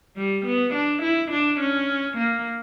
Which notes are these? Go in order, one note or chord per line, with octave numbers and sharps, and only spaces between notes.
G3
B3
D4
E4
D4
C#4
A#3